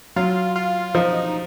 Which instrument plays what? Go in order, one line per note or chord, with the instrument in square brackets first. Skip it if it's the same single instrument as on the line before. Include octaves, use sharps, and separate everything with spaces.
[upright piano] F#3 [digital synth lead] F4
[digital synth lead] F4
[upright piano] F3 [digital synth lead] D#4